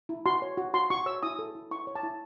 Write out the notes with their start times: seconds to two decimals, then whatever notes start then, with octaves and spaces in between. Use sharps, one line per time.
0.09 E4
0.26 F#4 C6
0.42 C#5
0.57 F#4
0.74 F#4 C6
0.90 F#4 C#6
1.06 C#5 E6
1.23 E4 D#6
1.39 A4
1.55 E4
1.71 E4 C#6
1.87 C#5
1.95 A5
2.03 E4